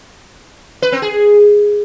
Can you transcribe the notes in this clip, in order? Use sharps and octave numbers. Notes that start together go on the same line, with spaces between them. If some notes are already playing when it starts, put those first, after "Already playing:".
B4
C4
G#4